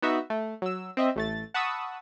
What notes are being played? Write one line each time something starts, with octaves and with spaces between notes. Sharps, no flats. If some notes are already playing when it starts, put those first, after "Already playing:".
B3 D#4 F#4 E5 E6
A3
F#3 E6
C4 D#5 E5
A1 A3 A6
F#5 A5 B5 C#6 D#6 E6